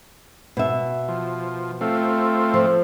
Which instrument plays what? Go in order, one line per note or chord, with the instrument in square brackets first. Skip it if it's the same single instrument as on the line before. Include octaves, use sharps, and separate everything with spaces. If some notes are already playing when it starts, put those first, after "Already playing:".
[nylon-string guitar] B2 E5
[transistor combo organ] F3
A3 C4 F4
[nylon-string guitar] F3